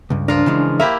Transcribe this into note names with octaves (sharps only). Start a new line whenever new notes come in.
C#2 G2
F3 D4 F4 A#4
C#3 E3 G#3
A#3 E4 G4 E5